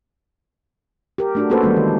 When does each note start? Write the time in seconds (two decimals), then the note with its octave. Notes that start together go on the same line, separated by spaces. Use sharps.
1.18 G4 A#4
1.35 A3 D4 F#4
1.50 A#3 C#4 F#4 A4 B4 C5
1.62 E3 G3 G#3 A#3 C#4 F#4
1.76 D#3